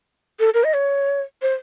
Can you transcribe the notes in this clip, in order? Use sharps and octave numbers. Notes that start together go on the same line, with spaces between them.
A4
A#4
D#5
C#5
C5